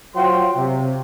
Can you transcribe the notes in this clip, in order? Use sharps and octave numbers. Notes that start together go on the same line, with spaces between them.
F#3 F4 F#4 C5 G5 C6
C3